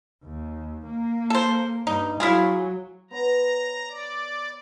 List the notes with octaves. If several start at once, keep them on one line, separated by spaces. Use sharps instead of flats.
D#2
A#3
A4 C5
G2 D#4
F#3 E4 F4 G#4
B3 C5 C#5 A#5
D5